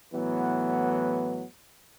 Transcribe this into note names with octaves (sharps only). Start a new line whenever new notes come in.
A2 E3 F#3 B3